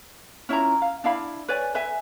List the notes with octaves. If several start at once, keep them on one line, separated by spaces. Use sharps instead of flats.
C#4 E4 F4 A#5
F5
D4 E4 F5 B5
B4 C#5 D5 G#5
B4 E5 G#5